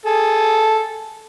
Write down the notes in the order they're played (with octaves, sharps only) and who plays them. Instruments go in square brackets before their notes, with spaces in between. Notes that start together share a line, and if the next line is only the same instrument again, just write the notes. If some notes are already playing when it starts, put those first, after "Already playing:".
[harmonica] G#4 A4